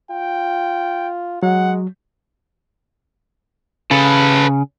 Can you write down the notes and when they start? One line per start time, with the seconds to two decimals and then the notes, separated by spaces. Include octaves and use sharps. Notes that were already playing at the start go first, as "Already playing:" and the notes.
0.11 F4 G5
1.43 F#3 G#3 F#5
3.91 C#3 A4 B4